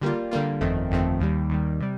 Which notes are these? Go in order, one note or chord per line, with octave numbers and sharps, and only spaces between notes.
D3 G3 A#3 F4
D3 G3 A#3 F4
G1 F2 D#3 A3 C4
G1 F2 D#3 A3 C4
D#2 D#3 G3
D#2 D#3 G3
C3 G3